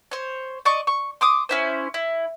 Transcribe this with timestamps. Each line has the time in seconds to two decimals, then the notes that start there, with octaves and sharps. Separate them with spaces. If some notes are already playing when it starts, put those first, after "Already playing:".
0.11 C5 C#5
0.65 D5 D#5 C#6
0.87 C#6
1.21 C6 D6 D#6
1.49 C#4 E4 C5
1.94 E4